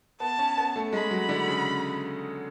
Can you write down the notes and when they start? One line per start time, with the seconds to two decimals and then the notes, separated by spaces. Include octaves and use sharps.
0.20 B3 A5
0.39 C#4
0.58 B3
0.76 A3
0.93 G#3 B5
1.11 F#3
1.29 D3
1.48 C#3